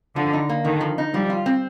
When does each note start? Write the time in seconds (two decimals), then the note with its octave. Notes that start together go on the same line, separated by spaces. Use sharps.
0.16 D3 F3
0.33 D#4
0.49 A#3
0.65 D3 D#3
0.81 F3
0.98 D#4
1.13 F3 G3
1.30 F4
1.46 C4